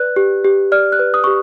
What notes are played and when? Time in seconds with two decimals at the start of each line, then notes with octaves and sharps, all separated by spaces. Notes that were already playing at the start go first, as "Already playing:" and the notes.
Already playing: B4 D5 F#6
0.16 G4
0.45 G4
0.72 D5 F6
0.92 F#6
0.99 B4
1.14 D#6
1.24 G4 C#6